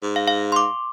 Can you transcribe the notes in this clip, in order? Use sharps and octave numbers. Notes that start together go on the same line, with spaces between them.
G#2
F5
F5
C6 D6